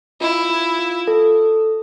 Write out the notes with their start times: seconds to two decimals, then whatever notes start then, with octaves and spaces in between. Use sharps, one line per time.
0.21 E4 F4
0.50 F4
0.79 F4
1.08 A4